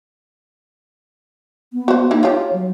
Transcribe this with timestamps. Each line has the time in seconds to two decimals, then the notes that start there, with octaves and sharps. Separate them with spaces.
1.73 B3
1.88 F#4 C5
2.11 A#3 D#4 E4 G4
2.23 F4 G4 C#5
2.53 F#3